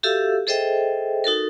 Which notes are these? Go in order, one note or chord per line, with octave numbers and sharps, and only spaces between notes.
F#4 G4 A4 E5 F5 E6
G#4 A4 C5 D#5 E5 G5
D#4 F#4 A4 A#4